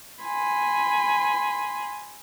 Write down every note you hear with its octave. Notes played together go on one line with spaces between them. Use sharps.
G#5 B5 C6